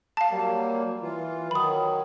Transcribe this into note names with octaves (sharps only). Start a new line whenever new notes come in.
F5 A5
F#3 G3 A#3
E3 F4
D#3 F#3 B5 D#6